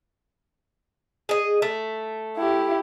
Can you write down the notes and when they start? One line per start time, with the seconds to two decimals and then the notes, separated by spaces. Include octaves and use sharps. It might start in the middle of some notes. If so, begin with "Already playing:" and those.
1.29 G#4 D#5
1.62 A3
2.37 E4 G4